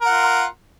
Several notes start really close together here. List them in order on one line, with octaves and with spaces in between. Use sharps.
A#4 F#5 F4